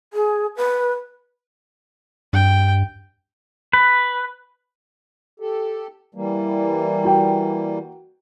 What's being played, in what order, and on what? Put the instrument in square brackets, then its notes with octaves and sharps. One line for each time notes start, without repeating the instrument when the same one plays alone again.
[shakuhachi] G#4
B4
[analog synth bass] G2 [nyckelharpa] G5
[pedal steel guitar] B4
[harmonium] G4 A4
E3 G3 A#3
[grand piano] F#4 G5